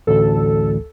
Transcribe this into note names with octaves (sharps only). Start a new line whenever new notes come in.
A1 D2 A4